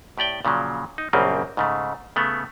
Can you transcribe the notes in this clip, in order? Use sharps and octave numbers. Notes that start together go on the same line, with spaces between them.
A2 G4 D5 G5
A#2 C#3 F3 F#3
D#4
A#1 F#2 C#3 G3 A#3 C4
G#2 C#3 A3
C#3 A3 B3